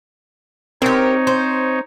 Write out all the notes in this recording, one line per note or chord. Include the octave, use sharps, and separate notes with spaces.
C4 D#4 G4 A#4 C#5
C5